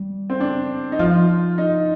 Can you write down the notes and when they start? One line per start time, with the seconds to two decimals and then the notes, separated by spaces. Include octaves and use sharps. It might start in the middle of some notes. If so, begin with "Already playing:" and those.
Already playing: G3
0.30 C4
0.40 D4
0.92 D#4
0.99 F3 F4
1.58 D#4